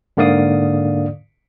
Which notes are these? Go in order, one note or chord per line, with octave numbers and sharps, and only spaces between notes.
G#2 D3 A#3 D5 F5 D#6